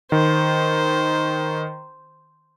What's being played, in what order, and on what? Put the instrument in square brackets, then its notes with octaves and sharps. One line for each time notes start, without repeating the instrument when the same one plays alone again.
[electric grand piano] D#3 [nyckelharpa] C5